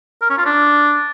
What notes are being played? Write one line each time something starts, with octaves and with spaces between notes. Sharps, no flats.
A#4
C#4
F4
D4